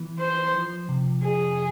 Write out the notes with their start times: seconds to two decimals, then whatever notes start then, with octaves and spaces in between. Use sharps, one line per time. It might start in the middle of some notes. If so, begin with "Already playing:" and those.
Already playing: E3 B3 E4
0.19 B4 C5
0.54 F3
0.89 C3
1.23 F2 G#4